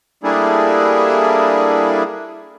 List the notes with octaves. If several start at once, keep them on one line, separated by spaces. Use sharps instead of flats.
G3 A3 A#3 D4 E4 G#4